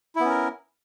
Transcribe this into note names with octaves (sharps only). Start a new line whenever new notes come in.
B3 C#4 E4 A#4